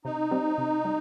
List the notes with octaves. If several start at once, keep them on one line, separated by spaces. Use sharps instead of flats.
C3 D#4
G3 C4
C3
G3